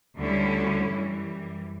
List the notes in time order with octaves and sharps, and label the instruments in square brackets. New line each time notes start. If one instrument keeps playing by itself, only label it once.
[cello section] D2 D3 G3 C#4 E4
F#2 E3 G3